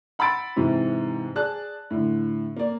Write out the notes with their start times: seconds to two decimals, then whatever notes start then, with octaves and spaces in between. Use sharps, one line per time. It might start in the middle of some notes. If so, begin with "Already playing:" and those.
0.19 F#5 B5 C6 E6 A6 D7
0.56 G#2 C3 E3
1.35 G#4 D5 A5 F#6
1.90 A2 D3
2.56 A#3 D5